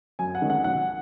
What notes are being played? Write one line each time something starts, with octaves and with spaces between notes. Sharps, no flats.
F#2 G#5
F#5
D#3 G#3 C#4
F#5
B1 F#5